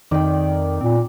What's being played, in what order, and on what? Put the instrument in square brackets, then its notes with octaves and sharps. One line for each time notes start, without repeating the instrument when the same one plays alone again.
[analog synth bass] F2 [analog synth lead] D#3 [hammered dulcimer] D5 G5
[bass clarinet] A#2 [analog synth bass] C4